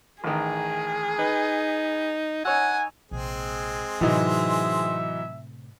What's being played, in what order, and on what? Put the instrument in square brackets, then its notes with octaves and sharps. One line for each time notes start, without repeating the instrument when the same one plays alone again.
[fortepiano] A1 D#3 [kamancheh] G#4
[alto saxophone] D#4 [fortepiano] B4
[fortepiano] D#4 C#5 E6 [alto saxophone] F#5 [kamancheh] G#5
[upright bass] A#1 C3 [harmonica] G#3 C4 G#4
[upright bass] A2 C3 [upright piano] E3 F#3 D#4 [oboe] E5